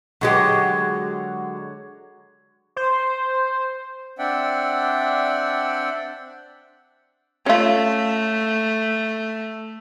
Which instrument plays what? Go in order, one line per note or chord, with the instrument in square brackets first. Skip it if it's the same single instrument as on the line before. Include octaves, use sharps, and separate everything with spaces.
[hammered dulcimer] D3 F#4 C#5 [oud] F#3 G#3 G4
[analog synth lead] C5
[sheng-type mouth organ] C4 D4 D5 E5 F#5 G5
[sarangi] A3 [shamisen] C#4 F4